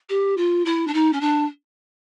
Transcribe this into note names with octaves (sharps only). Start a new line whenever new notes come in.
G4
F4
E4
D4
D#4
C#4
D4